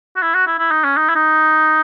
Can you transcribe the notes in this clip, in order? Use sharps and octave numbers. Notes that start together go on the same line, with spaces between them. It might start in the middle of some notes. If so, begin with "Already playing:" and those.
F#4
E4
F#4
E4
E4
D#4
C#4
D#4
E4
D#4